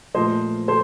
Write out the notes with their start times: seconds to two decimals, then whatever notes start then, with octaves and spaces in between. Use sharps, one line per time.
0.15 A#2 F3 A3 C5 D#5
0.68 A4 C5